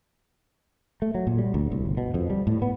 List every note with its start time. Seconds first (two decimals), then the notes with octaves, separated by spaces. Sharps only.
1.02 A3
1.15 F#3
1.27 A#2
1.38 G3
1.54 D2
1.72 C2
1.85 G1
1.97 B2
2.14 F2
2.30 G3
2.47 A2
2.62 B3